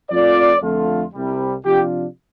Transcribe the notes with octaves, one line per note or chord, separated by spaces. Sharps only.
F2 F3 A3 F4 D5
F2 D3 A3 F4
C2 C3 G3
C3 F3 D4 F4 G4